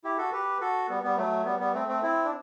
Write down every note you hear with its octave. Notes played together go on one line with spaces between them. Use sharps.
E4 G4
F#4 A4
G4 B4
F#4 A4
G3 B3
G3 B3
F#3 A3
G3 B3
G3 B3
A3 C4
A3 C4
C4 E4
D4